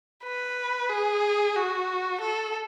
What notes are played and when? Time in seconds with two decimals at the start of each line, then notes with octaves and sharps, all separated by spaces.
0.24 B4
0.89 G#4
1.56 F#4
2.21 A4